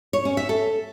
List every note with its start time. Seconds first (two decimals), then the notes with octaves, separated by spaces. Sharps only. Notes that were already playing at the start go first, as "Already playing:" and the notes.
0.13 C#5
0.25 C#4
0.37 E5
0.49 A4